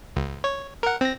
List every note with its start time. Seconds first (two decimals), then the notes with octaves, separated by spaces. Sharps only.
0.16 C#2
0.44 C#5
0.83 A#4 F#5
1.01 C4 A#6